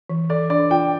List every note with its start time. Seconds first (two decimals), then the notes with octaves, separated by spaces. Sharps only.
0.10 E3
0.30 A4 D5
0.50 D4 D5
0.70 F4 G5